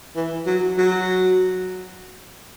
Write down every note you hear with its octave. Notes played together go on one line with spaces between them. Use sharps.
E3
F#3
F#3